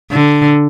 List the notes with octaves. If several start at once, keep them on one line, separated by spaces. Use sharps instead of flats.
D3